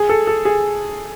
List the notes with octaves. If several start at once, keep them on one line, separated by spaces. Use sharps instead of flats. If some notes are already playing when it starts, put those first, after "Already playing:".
Already playing: G#4
A4
A4
G#4